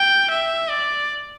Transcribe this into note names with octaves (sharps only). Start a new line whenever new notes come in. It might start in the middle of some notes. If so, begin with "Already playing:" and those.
Already playing: G5
E5
D5